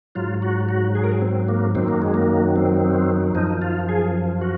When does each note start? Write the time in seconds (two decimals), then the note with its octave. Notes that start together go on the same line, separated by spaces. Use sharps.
0.15 G#2 F#3 F4
0.42 F#4
0.69 F#4
0.95 G#4
1.04 A#4
1.12 G#4
1.22 C4
1.48 A#3
1.75 F#2 D#3 F#3 C4
1.88 A#3
2.02 G#3
2.14 A#3
2.56 C4
3.35 F#2 F3 D#4
3.62 F4
3.89 G#4
4.41 F#4